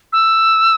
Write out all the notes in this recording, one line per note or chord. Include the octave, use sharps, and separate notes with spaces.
E6